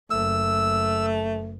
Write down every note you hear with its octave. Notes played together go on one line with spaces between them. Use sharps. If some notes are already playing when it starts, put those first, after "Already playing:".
F#1 A3 E6